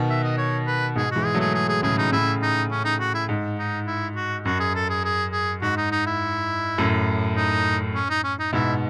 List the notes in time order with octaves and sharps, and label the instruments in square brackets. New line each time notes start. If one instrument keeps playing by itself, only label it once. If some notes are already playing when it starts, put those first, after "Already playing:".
Already playing: [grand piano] B2 D#3
[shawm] E5
D#5
C#5
B4
[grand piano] G#2 B2 [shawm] G#4
[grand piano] E3 G#3 [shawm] F#4
[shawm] G#4
[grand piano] F#3 A3
[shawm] G#4
G#4
G#4
[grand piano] A2 C#3 [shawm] G#4
[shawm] D#4
[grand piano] A2 C#3 [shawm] E4
[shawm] D#4
C#4
D#4
F#4
E4
[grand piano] G#2
[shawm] D#4
E4
F#4
[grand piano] F#2 [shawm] F#4
[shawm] G#4
A4
G#4
G#4
G#4
[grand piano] G#2 [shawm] F#4
[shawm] D#4
D#4
E4
[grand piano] F#2 A2
[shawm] D#4
C#4
D#4
C#4
D#4
[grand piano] G#2 B2 [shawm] E4